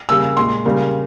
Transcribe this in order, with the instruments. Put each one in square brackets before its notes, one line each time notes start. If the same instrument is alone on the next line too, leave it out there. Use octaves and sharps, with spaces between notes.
[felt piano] C#3 G3 A#3 E6
A#2 G#3 C6
C#3 G3 A#3